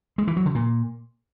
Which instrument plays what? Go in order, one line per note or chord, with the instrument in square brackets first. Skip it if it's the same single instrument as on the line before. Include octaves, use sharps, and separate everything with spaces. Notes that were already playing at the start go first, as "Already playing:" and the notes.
[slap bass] G#3
E3
F#3
D3
A#2